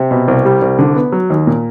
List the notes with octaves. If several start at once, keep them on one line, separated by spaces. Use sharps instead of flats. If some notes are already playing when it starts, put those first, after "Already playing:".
Already playing: C3
B2
C2
G3
C2
D3
B3
F#3
D#2
A#2